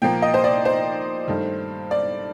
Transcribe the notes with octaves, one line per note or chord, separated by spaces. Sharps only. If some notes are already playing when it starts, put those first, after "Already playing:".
A#2 F3 A#3 G5
D#5
C5
D5
C5
G2 D#3 A3
D5